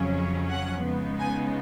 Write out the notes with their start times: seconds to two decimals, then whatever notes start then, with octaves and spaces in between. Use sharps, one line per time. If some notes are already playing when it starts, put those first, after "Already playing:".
Already playing: F2 C#3 F#3 C#4
0.50 F#5
0.85 C#3 G#3 B3 D#4
1.19 G#5